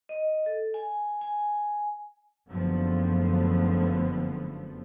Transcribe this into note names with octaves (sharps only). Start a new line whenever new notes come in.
D#5
A4
G#5
G#5
F#1 D3 F3 A3 B3